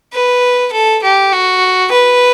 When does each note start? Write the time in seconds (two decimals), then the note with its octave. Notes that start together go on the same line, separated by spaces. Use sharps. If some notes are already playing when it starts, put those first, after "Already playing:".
0.13 B4
0.72 A4
1.03 G4
1.32 F#4
1.92 B4